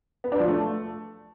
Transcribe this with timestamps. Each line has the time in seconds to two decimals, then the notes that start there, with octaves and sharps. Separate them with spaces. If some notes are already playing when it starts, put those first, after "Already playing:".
0.24 B3
0.32 D4
0.40 F3
0.48 A3